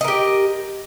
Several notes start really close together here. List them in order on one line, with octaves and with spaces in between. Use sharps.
D#5 A#4 G4